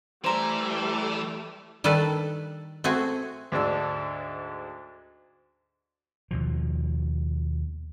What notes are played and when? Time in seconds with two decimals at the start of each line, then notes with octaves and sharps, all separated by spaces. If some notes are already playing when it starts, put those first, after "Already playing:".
0.24 E3 G3 A3 C5 A#5
1.84 D#3 G3 D4 A4 B4 D5
2.84 A3 C4 F#4 G#4
3.52 D2 G#2 D4 E6
6.31 D#2 B2 F3